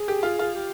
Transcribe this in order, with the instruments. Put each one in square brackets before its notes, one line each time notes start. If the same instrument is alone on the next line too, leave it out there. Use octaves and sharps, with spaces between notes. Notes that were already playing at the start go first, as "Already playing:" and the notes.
Already playing: [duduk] G#4
[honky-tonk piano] G4
F4
F4
[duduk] G4